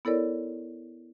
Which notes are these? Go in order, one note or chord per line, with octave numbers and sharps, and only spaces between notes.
B3 E4 A4 A#4 C#5 D5